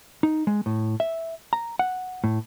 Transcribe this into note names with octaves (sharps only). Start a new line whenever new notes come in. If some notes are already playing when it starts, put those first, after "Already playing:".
D#4
G#3
A2
E5
A#5
F#5
A2